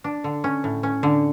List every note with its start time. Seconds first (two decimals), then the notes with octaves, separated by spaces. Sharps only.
0.04 D4
0.24 D3
0.44 C#4
0.64 A2
0.83 C#4
1.03 D3